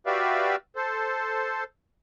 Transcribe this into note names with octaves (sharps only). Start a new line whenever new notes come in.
F#4 G4 B4 D5 E5 F5
A4 C5